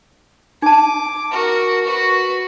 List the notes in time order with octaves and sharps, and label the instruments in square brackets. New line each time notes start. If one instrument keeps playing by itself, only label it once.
[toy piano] D#4 A5 [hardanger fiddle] D6
[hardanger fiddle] F#4 A#4
F#4 B4